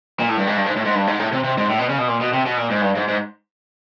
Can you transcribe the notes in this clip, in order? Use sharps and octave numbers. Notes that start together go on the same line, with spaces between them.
A#2
A2
G2
G#2
G2
G#2
A2
G#2
G2
G#2
A2
C3
C3
G#2
A2
B2
C#3
B2
A#2
B2
C3
B2
A#2
G#2
G2
G#2
G#2